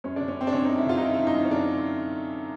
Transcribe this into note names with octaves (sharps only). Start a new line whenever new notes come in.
F#2 C#4
D3 D4
C#4
F#2 C4
D4
D3 C#4
F#2 D#4
E4
D3 F4
D#4
F#2 E4
D3 E4
D#4
F#2
C#4
D3 D4